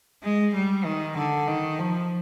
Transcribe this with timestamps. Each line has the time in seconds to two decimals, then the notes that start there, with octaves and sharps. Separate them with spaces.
0.23 G#3
0.55 G3
0.85 D#3
1.17 D3
1.48 D#3
1.79 F3